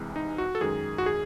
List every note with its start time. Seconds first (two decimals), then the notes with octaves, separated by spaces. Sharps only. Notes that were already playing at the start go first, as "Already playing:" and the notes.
Already playing: C2 C3 E3 G#3
0.16 D#4
0.38 F#4
0.55 A4
0.61 F#2 D#3 G#3 G#4
0.98 F#4
1.06 G#4